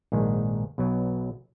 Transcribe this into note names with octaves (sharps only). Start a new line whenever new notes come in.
A#1 G#2 D#3 G#3
B1 B2 F#3